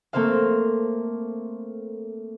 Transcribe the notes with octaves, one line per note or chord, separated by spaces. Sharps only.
A3 A#3 C4 C5 F5